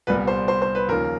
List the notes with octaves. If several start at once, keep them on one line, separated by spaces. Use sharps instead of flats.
C2 A#2 G3 B3 B4
C5
C5
C5
B4
D#2 C#3 F3 A#3 A#4